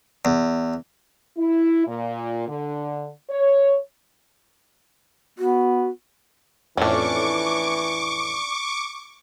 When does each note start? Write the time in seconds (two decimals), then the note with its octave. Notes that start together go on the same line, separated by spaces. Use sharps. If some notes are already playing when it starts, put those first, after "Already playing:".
0.25 E2
1.38 E4
1.87 A#2
2.48 D3
3.30 C#5
5.39 B3 F#4
6.77 F2 A2 E3 C#4 D4 C#6 D6